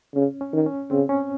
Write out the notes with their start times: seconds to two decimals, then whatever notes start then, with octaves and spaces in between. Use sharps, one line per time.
0.15 C#3 C#4
0.41 C#4
0.53 D#3
0.66 C#4
0.91 C#3 C4
1.09 C#4